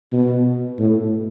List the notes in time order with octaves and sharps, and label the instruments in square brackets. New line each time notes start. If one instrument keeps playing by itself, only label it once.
[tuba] B2
A2